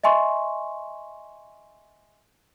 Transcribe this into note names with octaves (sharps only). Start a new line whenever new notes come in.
D#5 E5 G#5 C6 C#6